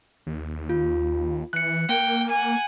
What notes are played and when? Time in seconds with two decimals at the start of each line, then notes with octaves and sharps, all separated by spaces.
0.27 D#2
0.69 F4
1.53 E3 F#6 C#7
1.89 A#3 G5
2.31 F#5 G#5